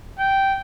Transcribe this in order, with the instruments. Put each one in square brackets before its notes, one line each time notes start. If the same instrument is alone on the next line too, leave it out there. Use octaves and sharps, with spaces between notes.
[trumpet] G5